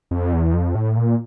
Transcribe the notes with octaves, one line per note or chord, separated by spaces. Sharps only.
F2
E2
F2
A2
A#2